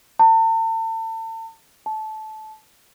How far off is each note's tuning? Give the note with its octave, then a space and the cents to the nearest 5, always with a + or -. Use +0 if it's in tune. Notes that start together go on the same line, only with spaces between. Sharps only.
A5 +40
A5 -20